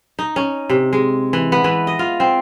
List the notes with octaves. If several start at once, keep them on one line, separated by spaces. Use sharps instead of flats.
D#4
C#4
C3
G#3
E3
B3
E3
D#5
F4
C4